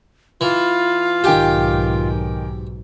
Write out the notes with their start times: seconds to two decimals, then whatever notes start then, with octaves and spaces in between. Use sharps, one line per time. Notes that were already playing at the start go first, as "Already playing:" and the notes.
0.41 E3 F4
1.24 B1 G#2 D#3 G4 G5 G#5